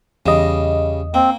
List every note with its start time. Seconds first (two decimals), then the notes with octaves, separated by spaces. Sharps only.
0.26 E2 C#3 G3 D#5
1.14 A#3 C4